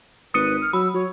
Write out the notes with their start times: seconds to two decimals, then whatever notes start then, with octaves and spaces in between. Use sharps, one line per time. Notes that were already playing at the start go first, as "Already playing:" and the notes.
0.34 G#1 B4 D#6 C#7 D#7
0.61 F6
0.73 F#3 B5 E6
0.94 F#3 C#5